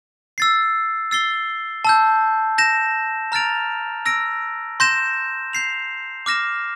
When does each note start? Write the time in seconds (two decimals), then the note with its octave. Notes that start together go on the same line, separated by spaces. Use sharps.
0.38 E6 A6 C7
1.11 E6 A6 C7 G7
1.85 A5 E6 G6
2.58 G6 A#6 E7
3.32 A#5 F6 A6 D7 F7
4.06 E6 A#6 D7
4.80 C6 G6 A#6 E7
5.53 G6 C7 F7
6.26 D6 F6 A#6 E7